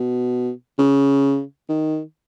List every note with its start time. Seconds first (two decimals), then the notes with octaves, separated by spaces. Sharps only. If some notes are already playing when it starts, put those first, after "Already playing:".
Already playing: B2
0.79 C#3
1.69 D#3